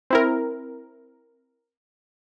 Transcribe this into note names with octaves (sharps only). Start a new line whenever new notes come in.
C4 E4 A#4